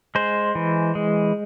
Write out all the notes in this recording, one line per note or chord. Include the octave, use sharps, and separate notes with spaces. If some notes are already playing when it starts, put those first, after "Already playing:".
G#3 C5
E3
G#3